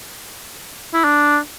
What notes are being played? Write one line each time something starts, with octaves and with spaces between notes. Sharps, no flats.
E4
D4